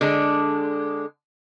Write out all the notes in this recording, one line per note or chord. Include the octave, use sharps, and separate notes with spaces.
D3 G#3 D4